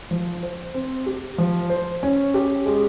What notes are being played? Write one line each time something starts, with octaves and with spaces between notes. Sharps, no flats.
F3
C5
C4
G4
F3
C5
C#4
G4
G#3